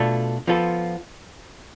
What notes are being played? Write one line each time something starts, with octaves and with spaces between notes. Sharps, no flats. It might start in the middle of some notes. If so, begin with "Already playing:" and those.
Already playing: B2 A3 D4 F4 A4
F3 B3 F4 A4